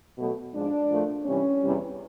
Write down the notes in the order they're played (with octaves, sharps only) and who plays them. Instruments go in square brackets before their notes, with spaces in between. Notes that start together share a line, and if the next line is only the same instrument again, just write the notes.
[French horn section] B2 F#3 A3
G#2 F3 G#3 D4
A#2 F3 A3
C3 E3 G3 C#4
E2 C3 E3 G3